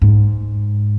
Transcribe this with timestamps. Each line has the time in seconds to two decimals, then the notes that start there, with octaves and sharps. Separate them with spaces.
0.02 G#2